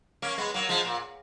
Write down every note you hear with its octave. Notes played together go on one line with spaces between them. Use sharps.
A#3 C#4
G#3 B3
F#3 A#3
F3 G#3
A#2